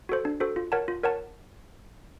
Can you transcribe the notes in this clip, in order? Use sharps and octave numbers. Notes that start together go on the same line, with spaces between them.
F#4 A4 C5
D4
F#4 A4 C5
F4
A#4 C#5 F#5 A5
F4
A#4 C#5 F#5 A5